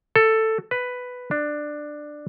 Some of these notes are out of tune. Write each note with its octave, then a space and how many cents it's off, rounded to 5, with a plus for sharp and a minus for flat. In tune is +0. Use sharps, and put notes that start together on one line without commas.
A4 +10
B4 +5
D4 +15